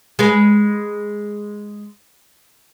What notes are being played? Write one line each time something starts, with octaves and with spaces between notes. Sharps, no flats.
G#3 G#4 B4